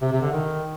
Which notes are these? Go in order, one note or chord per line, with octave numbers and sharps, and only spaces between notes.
C3
C3
D3
D#3